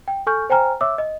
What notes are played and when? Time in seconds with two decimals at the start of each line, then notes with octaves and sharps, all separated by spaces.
0.08 G5
0.27 A4 G#5 C#6 F6 G6
0.50 C5 G5 G#5 A#5 F6
0.81 C#5 E5 D6 E6
0.98 D#5